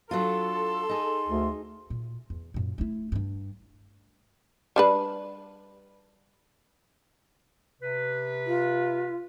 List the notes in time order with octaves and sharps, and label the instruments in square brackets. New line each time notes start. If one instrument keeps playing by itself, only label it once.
[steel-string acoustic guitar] F#3 D4 F4 [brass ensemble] A4 [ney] C6
[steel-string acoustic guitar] D#4 G#4
[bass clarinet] D2
[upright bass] A#2
E2
F#2 A#2
A3 E4
G2 D4
[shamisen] G3 D4 B4
[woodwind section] C3 B4
[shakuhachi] F4